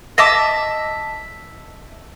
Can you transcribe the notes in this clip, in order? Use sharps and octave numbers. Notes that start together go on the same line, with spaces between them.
D#5 E5 A5 D6